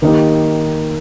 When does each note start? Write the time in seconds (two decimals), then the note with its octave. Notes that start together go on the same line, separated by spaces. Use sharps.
0.02 D#3 A#3 D#4 G4